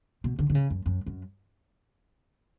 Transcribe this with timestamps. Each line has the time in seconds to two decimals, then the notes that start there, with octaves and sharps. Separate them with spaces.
0.24 B2
0.39 D3
0.50 D3
0.55 C#3
0.70 F#2
0.86 F#2
1.06 F#2